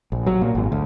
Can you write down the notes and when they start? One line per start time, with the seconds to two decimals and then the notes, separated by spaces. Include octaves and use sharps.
0.12 A#1
0.26 F#3
0.42 A#2
0.55 G#1
0.72 D2